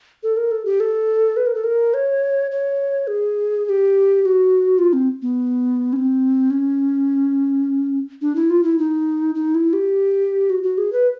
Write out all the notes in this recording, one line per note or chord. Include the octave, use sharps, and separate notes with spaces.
A4
A#4
A4
G4
A4
B4
A#4
A4
A#4
C#5
C#5
G#4
G#4
G4
G4
F#4
F4
C4
B3
C#4
C4
C#4
D4
E4
F4
E4
D#4
D#4
E4
G4
F#4
F#4
G#4
B4